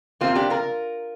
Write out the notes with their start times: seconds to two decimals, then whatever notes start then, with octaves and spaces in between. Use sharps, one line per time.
0.21 C3 F3 A#3 C4 F4
0.36 D4 G4
0.50 F4 A#4